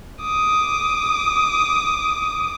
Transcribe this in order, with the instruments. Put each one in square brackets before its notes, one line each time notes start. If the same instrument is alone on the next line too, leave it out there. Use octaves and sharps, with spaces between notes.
[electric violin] D6 D#6